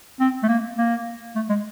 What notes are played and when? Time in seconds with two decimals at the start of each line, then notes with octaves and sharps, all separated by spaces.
0.20 C4
0.43 A3
0.48 A#3
0.78 A#3
1.35 A3
1.49 G#3